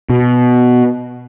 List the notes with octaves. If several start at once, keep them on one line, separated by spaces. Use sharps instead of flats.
B2